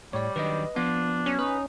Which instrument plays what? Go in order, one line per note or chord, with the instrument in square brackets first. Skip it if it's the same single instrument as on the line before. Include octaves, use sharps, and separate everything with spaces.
[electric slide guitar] A2 [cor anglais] G3 [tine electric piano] C#5 D5
[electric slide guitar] D#3 F#3 D4 [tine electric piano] B4 D#5
[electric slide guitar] F3 F4 [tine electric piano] B3 [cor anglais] D4
[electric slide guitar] F#3 [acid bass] C#4
[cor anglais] D#4 [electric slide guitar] B4